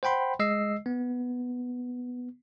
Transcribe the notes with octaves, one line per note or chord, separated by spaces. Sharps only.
C5 F#5 G5 B5 C6
G#3 D#5 E6 C7
B3